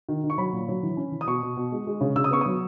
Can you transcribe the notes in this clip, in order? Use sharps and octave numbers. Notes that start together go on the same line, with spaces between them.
D#3
D#3
C#6
F#3 B5
A#2
F#3
E3
C#4
E3
D#6
B2 C#6
B2
B2
G#3
G#3
C#3
C#3 E6
D#6
B3 C#6
F#3 D#6